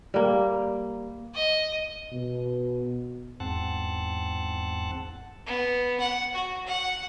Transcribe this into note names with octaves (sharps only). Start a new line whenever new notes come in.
G3 A#3
D#5
B2
E2 G#2 C4 F#5 A5
B3
F#5
F#4
F#5